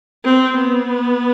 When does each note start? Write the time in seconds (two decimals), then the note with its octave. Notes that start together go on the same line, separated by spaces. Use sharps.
0.25 C4
0.58 B3